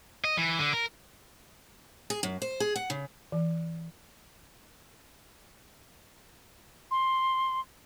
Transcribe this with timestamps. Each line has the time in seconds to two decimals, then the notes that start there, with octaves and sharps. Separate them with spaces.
0.24 D#5
0.37 E3
0.59 D3
0.73 A#4
2.10 G#4
2.23 F#2
2.42 C5
2.60 G#4
2.76 F#5
2.90 C#3
3.32 E3
6.91 C6